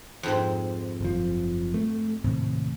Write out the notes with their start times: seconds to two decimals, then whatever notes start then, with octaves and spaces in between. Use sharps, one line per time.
0.23 F2 G#2 C4
1.01 F#1 F3
1.74 A3
2.24 D#2 A2 C3